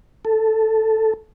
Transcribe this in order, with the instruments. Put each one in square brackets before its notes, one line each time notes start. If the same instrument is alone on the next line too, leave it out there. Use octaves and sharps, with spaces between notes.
[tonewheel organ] A4